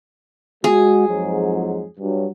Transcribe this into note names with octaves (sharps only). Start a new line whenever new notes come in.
G#3 F#4 G#4
F2 G#2 F#3
G2 F#3